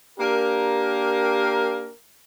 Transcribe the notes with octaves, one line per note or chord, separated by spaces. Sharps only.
A#3 D4 G4 A#4